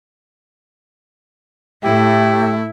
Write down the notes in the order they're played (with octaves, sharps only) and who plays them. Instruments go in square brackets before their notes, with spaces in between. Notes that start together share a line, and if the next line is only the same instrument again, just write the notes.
[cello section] A2 [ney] A3 [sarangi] E4 [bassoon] G4